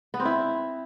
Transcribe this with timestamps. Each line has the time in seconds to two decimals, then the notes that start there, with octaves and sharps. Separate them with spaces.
0.14 B3
0.20 C4
0.25 E4